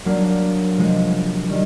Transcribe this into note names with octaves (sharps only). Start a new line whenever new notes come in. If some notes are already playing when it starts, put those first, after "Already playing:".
F#3 A#3 D4
C3 F3 G#3
D#3 G3